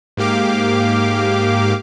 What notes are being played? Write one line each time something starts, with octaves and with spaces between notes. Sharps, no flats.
G#2 A#3 G4 F5 D6